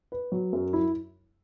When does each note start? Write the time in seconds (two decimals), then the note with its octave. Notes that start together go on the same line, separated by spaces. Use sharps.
0.12 B4
0.32 F#3
0.53 F#2
0.73 E4